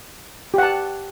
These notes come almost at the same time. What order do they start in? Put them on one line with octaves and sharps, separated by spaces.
G4 F#5 A5